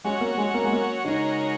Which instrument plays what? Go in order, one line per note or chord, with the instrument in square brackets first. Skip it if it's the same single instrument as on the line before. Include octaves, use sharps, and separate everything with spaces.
[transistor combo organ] F#3 C#4 F#4 C#5 [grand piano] G#3
[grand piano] A#3
G#3
A#3
G#3
A#3
[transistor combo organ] C#3 G#3 F#4 A#4 C#5 [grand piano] D#4